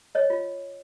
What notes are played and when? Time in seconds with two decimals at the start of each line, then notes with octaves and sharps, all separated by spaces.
0.15 C#5 D#5
0.30 F4